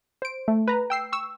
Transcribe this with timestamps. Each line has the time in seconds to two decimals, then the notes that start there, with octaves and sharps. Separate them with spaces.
0.22 C5 D7
0.48 A3
0.68 B4 A#5
0.90 G5 E6 C7
1.12 C#6 E6